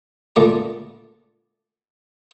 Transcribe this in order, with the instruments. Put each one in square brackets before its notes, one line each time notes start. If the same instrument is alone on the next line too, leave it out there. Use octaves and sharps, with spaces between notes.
[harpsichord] C#2 A#2 D3 A3 D5 A#5